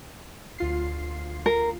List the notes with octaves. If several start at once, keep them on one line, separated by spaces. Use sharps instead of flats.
D2 F4 C7
A#4